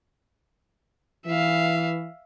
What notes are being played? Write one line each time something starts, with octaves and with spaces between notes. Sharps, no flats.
E3 E5 F5